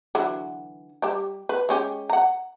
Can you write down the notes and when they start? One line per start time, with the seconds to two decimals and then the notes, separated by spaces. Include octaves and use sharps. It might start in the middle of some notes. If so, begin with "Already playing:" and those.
0.15 D3 E3 F#3
1.02 G3 G4
1.49 B4
1.69 G#3 C#4 G4
2.10 F#5 A#5